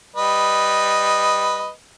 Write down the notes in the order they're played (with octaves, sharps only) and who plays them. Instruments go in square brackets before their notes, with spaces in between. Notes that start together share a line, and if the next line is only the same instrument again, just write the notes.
[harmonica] G3 B4 D#5